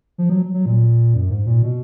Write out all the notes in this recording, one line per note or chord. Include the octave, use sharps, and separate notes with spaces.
F3
F#3
F#3
A#2
F#2
G#2
A#2
B2